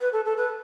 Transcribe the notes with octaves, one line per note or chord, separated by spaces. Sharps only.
B4
A4
A4
B4